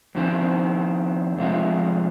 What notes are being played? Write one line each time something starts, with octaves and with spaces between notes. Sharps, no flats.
F2 D#3 C4
F2 C3 G#3 F4